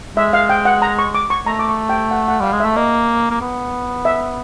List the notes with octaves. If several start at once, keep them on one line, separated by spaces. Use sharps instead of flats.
G#3 E5
F5
G5
F#5
A#5
C#6
D6
C#6
A3 A#5
D6
C#6
G5
F#5
F#5
G3 F5
G#3
A3 E5
A#3 D#5
A#3
B3
E5